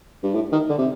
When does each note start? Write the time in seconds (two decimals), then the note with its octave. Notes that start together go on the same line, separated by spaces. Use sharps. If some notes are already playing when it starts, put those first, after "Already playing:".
0.23 G2
0.35 A2
0.52 D#3
0.70 D3
0.78 C3